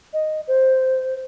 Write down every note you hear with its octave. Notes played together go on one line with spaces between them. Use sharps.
D#5
C5